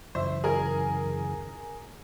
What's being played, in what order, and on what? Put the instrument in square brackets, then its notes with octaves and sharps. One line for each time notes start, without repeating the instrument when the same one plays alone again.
[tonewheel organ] F#2 C#3 E3 [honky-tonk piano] C5 E5
[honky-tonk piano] G#4 A#4